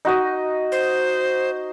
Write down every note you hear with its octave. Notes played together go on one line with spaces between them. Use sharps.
D#4 F#4 D#5
C5